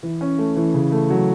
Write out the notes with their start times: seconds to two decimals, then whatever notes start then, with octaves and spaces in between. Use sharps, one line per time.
0.03 E3
0.21 C#4
0.38 A3
0.56 E3
0.74 C#3
0.92 A3
1.10 F#3